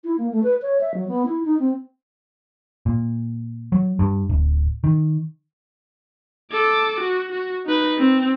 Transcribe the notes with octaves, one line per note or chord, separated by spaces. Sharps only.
E4
A#3
A3
B4
C#5
E5
F#3
B3
E4
D#4
C4
A#2
F#3
G2
D1
D#3
A4 D6
F#4
F#4
D#4 B4
C4